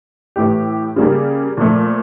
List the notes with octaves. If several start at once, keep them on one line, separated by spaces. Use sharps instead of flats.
A2 E3 A3 E4 G4
C#3 G3 A#3
A#2 F3 A3